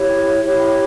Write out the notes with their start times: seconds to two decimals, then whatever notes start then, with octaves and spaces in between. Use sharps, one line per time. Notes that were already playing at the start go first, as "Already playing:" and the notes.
Already playing: E4 G4 C#5
0.44 E4 G4 C#5